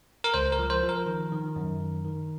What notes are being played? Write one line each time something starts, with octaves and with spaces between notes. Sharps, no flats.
A#4
C#2 C5
A#4
F3
C5
F3
A#4
D#3
D#3
F#2
D#3
D#3